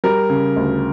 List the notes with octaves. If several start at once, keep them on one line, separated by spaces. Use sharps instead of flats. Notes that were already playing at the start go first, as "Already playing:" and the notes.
G3 A#4
C#3
D2